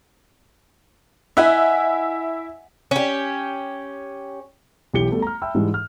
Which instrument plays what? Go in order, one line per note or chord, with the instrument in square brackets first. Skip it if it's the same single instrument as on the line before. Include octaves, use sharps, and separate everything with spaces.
[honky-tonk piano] E4 E5 [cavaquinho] D#5 F#5 G#5
[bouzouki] C#4 G4
[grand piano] B1 E3 G4 C#7 G7
G3 A3 B3
A#5 F6
E5 G5 A5 B5 E6
G#2 E3 G3 G#3
F6